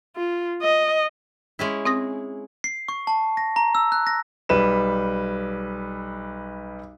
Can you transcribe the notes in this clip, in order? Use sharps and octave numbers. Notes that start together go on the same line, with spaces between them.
F4
D#5
G#3 C#4 E4
C4 D#6 A#6
C7
C#6
A5
A#6
A#5
E6
F#6
A#6
B1 G3 B4 E7